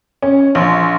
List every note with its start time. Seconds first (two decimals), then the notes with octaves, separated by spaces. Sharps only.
0.22 C#4
0.55 A#1